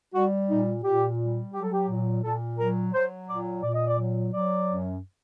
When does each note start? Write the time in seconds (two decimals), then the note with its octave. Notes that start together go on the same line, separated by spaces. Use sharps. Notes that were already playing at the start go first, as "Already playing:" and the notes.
0.14 G3 F#4
0.49 A#2 D#4
0.84 A#2 G4
1.19 G3
1.53 F#3 G4
1.63 A4
1.73 G4
1.89 A#2
2.23 A#2 A4
2.58 F#3 A#4
2.94 F#3 C5
3.29 A#2 D5
3.63 A#2 D5
3.75 D#5
3.87 D5
3.99 F#3
4.33 F#3 D5
4.69 F#2